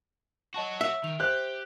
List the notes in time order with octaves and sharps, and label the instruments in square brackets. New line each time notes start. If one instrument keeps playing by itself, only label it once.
[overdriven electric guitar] F#4 C#5 [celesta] D#5 A5 C#6
[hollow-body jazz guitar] E5 [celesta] E6
[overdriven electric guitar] D#3 [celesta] F7
[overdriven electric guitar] G4 [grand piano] C5 F#6